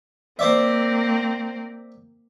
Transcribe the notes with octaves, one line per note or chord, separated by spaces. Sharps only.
A#3 C4 C5 D5 E5